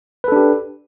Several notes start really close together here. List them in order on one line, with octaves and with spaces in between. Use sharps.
B4 A4 D4 G4